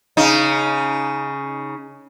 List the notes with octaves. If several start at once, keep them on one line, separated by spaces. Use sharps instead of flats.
C#3 D#4